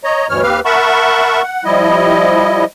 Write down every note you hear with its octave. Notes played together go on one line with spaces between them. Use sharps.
C#5 D#5 A#5
D2 G2 B2 E3 C#5 F6
D#2 C4 G4 B4 F5 F6
A#4 E5 F#5 A5 B5 C#6
F#5
F3 G3 E4 D#5